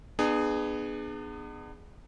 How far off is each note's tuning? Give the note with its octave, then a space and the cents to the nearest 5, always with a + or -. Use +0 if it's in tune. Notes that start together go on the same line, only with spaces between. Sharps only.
B3 +5 D4 +45 G#4 +0